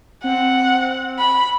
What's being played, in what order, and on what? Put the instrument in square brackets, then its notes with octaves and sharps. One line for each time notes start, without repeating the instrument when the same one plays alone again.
[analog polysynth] C4 [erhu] F#5
[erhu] B5